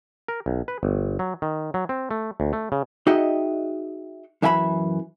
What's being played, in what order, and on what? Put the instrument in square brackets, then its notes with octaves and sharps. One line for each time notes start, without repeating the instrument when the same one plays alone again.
[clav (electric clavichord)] A#4
B1
B4
G1
F#3
D#3
F#3
C4
A3
D2
A3
C#3
[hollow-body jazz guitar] D#4 F#4 G#4 D#5 E5 G5
F#2 E3 E5 G#5 A#5 B5